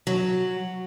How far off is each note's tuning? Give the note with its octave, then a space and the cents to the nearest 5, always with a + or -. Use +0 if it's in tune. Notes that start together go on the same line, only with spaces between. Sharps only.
F#3 -5